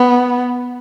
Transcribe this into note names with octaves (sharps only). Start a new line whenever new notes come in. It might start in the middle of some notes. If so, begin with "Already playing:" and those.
Already playing: B3